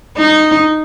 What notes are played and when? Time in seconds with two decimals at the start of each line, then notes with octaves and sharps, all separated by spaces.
0.17 D#4